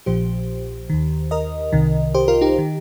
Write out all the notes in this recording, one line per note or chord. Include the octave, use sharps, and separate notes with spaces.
A#1 A#2 F3 G4 C5
D#2 D#3
A#4 D#5
C2 C3 D#3
G4 C5
F4 A#4
D#4 G4
D#3